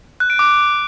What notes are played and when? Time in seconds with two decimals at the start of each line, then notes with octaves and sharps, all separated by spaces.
0.20 F#6
0.30 D7
0.39 D6